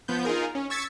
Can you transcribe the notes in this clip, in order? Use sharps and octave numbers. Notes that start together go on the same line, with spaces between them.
F3 B3 G6
D#4 F4 G#4 A#4
C#4
C#6 E6 G#6 A6 B6 C#7